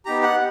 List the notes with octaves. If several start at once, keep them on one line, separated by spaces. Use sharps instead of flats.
B3 D#4 G4 A#5
F#5